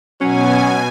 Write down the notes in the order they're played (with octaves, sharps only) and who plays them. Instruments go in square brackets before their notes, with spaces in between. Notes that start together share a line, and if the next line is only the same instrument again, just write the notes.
[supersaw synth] B2 G#5 [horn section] F#3 C#4